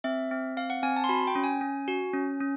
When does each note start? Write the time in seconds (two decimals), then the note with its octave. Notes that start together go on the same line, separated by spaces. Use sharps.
0.04 C4 E5
0.31 C4
0.57 C4 F5
0.70 F#5
0.83 C4 G#5
0.97 A5
1.04 C6
1.09 F#4 B5
1.27 G5
1.35 C#4
1.44 G#5
1.61 C#4
1.88 F#4
2.14 C#4
2.40 C#4